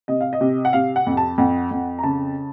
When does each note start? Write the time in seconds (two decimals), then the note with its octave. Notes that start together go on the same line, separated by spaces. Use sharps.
0.08 C3 D#5
0.21 F5
0.33 D#5
0.41 C3
0.65 F#5
0.73 C3 F5
0.96 F#5
1.07 F2
1.17 A5
1.38 F2 F#5
1.71 F2
1.99 A#5
2.03 C#3 A5